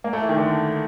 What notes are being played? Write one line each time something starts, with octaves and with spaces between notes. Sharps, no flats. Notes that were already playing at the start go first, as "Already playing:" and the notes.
A#3
A3
E3
D#3
D3